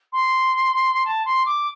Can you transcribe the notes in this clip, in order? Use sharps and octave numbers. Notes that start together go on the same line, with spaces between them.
C6
A5
C6
D6